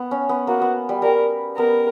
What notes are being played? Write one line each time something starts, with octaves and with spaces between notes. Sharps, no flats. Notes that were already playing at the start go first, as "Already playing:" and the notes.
Already playing: B3
C#4
B3
A#3 F#4
B3
G3
G3 A#4
B3 A#4